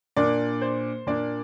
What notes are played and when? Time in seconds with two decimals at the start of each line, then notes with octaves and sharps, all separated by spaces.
0.16 A#2 A#3 D4 D5
0.62 C5
1.07 A#2 A#3 D4 D5